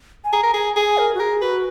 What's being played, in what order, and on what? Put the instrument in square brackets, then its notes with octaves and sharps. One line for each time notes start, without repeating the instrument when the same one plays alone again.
[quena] G#5
[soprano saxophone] G#4 [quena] A#5
[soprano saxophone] A#4
[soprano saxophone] G#4 [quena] G#5
[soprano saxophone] G#4 [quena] G#5
[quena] A#4
F#4
[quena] G#4 [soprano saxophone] A#4
[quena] F#4 [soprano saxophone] B4